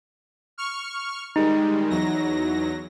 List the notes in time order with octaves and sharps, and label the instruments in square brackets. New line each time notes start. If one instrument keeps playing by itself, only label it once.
[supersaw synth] C#6 F6
[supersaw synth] D#3 G3 G#3 [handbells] D#4
[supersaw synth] E2 F#3 A#6